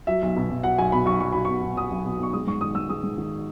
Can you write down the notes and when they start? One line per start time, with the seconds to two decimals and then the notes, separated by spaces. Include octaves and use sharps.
0.07 F#3 E5
0.22 B1
0.36 B2
0.50 B1
0.63 F#3 F#5
0.78 B1 G#5
0.92 B2 B5
1.06 B1 C#6
1.20 F#3 C#6
1.32 B1 B5
1.45 B2 C#6
1.62 B1
1.77 F#3 D#6
1.91 B1
2.04 B2
2.19 B1 C#6
2.33 G#3 D#6
2.47 G#2 C#6
2.61 D#3 D#6
2.75 G#2 E6
2.90 G#3 D#6
3.03 G#2
3.18 D#3